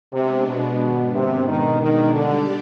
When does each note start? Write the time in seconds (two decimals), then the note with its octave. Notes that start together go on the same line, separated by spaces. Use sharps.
0.13 C3 G#3 B3 D4
0.47 B2
0.80 G#2 D#3 B3 D4
1.14 C3
1.47 B2 D#3 G#3 D4
1.81 D#3
2.13 D3 G3 D4 G4 D5